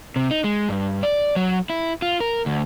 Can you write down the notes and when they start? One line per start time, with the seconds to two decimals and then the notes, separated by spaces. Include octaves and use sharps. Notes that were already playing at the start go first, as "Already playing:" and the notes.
0.16 C3
0.31 D#4
0.44 G#3
0.69 G2
1.03 D5
1.36 F#3
1.70 E4
2.02 F4
2.21 A#4
2.46 D2